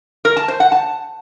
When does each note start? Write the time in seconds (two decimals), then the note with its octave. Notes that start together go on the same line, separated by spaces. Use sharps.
0.25 A#4
0.37 A5
0.48 C5
0.60 F#5
0.72 A5